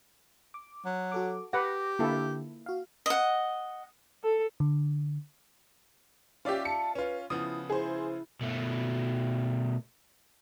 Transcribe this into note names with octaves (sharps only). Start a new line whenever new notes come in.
D6
F#3
F#4 A4 D6
G4 B4 F#5 D6 A#6
D3 A#3 E4 A4
F#4 F5
D#5 F#5
A4
D3
C#4 F4 G4 D5 E5
A5 C#7
C#4 F4 B4
C#3 F3 B3 E4 D#6
E4 G#4 C5
B2 A3